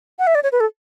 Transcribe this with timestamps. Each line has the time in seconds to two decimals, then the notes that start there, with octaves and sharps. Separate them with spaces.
0.19 F#5
0.27 E5
0.35 D5
0.43 C#5
0.52 B4
0.60 A4